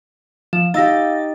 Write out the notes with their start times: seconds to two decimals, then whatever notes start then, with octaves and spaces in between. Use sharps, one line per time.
0.53 F3 E7
0.74 D#4 G4 F5 E6 A6 A#6